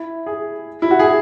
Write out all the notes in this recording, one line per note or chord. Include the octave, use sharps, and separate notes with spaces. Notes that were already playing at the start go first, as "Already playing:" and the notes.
Already playing: E4
G#4
E4
F#4
G#4